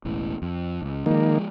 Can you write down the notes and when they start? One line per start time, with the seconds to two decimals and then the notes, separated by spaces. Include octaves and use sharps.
0.05 E1 A1 E3
0.42 F2
0.82 C#2
1.06 D#3 F3 G#3 A#3